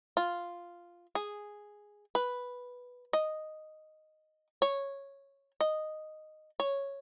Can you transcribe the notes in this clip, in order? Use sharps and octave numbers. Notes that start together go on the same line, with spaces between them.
F4
G#4
B4
D#5
C#5
D#5
C#5